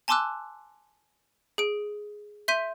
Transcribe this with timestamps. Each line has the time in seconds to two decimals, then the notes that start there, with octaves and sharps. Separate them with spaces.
0.08 G#5 A5 C6 D6 E6 F#6
1.58 G#4 D7
2.48 E5 C6 G6 B6 D#7